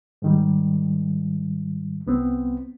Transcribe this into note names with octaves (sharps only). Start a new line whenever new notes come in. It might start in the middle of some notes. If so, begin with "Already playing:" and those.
G#2 D#3 G3
C2 B3 C4